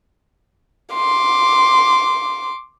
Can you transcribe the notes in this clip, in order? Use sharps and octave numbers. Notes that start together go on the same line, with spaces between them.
C6 D6